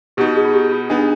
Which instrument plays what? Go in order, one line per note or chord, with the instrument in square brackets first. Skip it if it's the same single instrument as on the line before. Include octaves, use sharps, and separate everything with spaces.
[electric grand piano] B2 B3 D#4 [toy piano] G4
[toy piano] G#4
F4
G4
F4
[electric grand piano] B3 D#4 G#4 [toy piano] D4